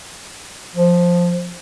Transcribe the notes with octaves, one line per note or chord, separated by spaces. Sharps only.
F3